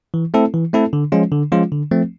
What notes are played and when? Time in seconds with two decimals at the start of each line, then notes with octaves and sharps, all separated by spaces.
0.14 E3
0.34 A3 C4 E4 A4
0.54 E3
0.73 A3 C4 E4 A4
0.93 D3
1.12 F3 G#3 C#4 F4
1.32 D3
1.52 F3 G#3 C#4 F4
1.72 D3
1.91 F3 A3 C4